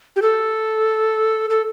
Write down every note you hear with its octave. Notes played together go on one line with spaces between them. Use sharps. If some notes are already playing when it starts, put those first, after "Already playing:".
G4
A4
A4